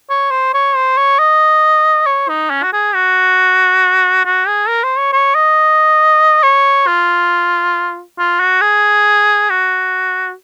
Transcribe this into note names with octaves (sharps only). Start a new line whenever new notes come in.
C#5
C5
C#5
C5
C#5
D#5
C#5
D#4
C#4
F#4
G#4
F#4
F#4
G#4
A#4
C5
C#5
C#5
D#5
C#5
F4
F4
F#4
G#4
F#4